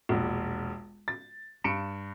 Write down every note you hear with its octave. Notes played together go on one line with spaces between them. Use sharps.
E1 A#1
A6
G2 C#7 D7 E7